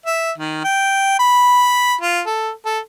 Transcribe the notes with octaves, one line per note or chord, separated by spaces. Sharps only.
E5
D#3
G5
B5
F4
A4
A4